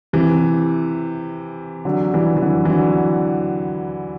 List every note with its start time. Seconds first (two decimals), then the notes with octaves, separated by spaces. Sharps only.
0.13 C3 E3
1.85 D3 F#3
2.13 E3 G3
2.37 E3
2.42 D3 F#3
2.65 E3
2.70 D3 F#3